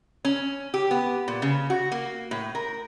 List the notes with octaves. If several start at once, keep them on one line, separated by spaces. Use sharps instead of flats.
C#4
G4
B3
A#2
C#3
F#4
A#3
A2
A#4